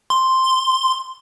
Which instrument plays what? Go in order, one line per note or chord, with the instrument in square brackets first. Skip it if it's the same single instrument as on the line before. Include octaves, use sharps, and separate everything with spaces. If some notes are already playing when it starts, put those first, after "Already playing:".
[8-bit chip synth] C6